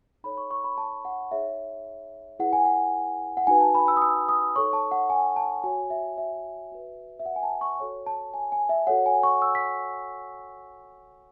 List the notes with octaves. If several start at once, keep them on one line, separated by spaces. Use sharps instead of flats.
D#4 A4 C#5 B5
C#6
C#6
B5
A5
F#5
D#4 G#4 C#5 E5
E4 G#4 B4 F#5
G#5
F#5
F#5
D#4 F#4 B4 G#5
A5
B5
E6
D#6
E6
D#6
D#4 A4 C#5 C#6
A5
F#5
G#5
A5
F#4 C#5 G#5
E5
E5
F#4 B4
E5
F#5
G#5
A5
C#6
F#4 A4 C#5
A5
G#5
G#5
E5
F#4 A4 C#5 F#5
G#5
C#6
E6
B6